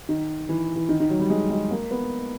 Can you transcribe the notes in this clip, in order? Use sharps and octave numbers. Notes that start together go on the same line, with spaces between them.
D#3
E3
E3
D#3
D#3
F#3
G3
G#3
G#3
A#3
B3